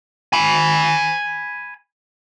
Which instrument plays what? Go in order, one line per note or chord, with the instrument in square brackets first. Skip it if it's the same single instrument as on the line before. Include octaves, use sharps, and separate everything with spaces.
[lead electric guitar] G#5 B5